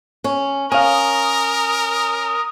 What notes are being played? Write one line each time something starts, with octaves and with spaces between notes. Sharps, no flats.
C#4
C#4 A#4 F5 G#5 D#6